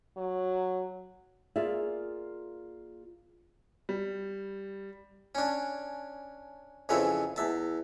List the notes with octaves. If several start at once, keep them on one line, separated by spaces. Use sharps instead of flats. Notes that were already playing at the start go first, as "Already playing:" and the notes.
F#3
A#3 F4 G#4 D5 E5
G3
C#4 D4
F2 C#3 E3 C4 E5
E2 E5 A5